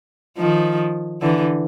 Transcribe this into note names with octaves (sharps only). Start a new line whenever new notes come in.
D#3 F3
D3 E3